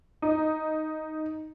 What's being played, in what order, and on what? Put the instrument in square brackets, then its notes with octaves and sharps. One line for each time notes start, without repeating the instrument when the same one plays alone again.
[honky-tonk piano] D#4